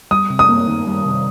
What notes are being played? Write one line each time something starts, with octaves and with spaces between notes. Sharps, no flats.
G3 D#6
C3
D#6
A#3
D#3
G3
C3